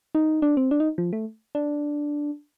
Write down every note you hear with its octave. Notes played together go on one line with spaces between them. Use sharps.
D#4
D4
C4
D4
D#4
F3
A3
D4